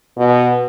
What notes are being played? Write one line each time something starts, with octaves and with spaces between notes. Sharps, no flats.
B2